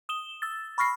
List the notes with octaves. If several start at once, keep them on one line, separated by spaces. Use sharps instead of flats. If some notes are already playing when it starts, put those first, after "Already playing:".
D#6 E7 G7
E6 A6
B5 C#6 F6 A#6 C7